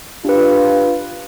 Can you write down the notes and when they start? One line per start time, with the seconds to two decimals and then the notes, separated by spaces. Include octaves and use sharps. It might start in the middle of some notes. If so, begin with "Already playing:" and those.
0.25 D4 F4 G4 B4